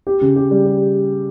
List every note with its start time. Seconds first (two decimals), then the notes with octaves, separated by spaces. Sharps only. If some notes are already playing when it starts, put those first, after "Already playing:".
0.07 G4
0.21 C#3
0.36 G4
0.51 G3
0.66 G4